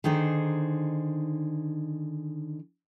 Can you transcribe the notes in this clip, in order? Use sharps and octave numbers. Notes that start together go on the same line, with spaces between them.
D3 D#3 D#4 G#4 C5